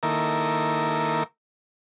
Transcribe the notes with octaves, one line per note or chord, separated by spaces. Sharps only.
D#3 A#3 E4 A4 A#4